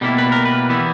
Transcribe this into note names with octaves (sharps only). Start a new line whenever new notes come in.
B2 G3 A#3 E4
B4
A#4
B4
E3 G3 B3 E4